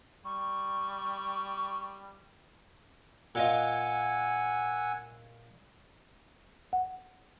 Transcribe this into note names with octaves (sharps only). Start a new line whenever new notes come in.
G3 C#6
A#2 F4 D#5 F#5 G#5 E6
F#5